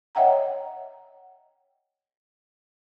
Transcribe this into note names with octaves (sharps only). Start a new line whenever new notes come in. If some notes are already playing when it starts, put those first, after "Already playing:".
C#5 D#5 E5 F#5 G5 A#5